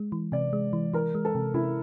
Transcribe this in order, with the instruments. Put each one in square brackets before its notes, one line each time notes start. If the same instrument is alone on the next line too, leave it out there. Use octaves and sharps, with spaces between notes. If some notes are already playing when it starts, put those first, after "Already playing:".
Already playing: [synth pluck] G#3
E3
[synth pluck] C3 [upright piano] D5
[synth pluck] G#3
E3
[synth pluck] E3 [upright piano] A#4
[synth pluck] G#3
[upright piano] A4
[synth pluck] C3
[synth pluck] C3 [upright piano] E4